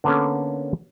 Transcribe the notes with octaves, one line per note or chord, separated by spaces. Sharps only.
D3 A#3 B3 C#4 A4